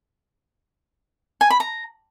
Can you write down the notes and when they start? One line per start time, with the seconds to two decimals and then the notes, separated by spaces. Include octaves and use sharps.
1.41 G#5
1.50 B5
1.60 A#5